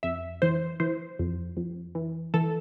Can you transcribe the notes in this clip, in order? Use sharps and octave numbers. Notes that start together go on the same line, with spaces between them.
F2 E5
E3 C5
E3 C5
F2
F2
E3
E3 A4